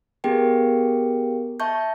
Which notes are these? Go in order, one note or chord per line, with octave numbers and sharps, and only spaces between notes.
B3 G4 G#4 A#4 G5
E5 A5 C#6 G6